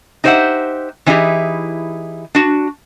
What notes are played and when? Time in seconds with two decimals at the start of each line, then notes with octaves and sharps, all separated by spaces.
0.24 D#4 G4 C5 C#5 E5 F#5
1.06 E3 C#4 D#4 E4 G4 G#4
2.35 D4 F#4